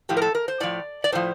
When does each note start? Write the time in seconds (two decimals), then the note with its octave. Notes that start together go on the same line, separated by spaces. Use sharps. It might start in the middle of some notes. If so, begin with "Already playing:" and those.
0.09 A2 F3 G4
0.17 A#4
0.22 A4
0.35 A#4
0.48 C5
0.60 A2 F3 D5
1.04 D5
1.12 A2 F3 C5